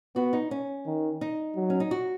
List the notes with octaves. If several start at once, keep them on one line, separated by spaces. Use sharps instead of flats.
B3 F#4
D#4
C#4
D#3
D#4
F#3
C#4
D#4
F#4